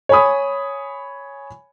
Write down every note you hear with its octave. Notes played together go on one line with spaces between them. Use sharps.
C#5 G#5 B5 D#6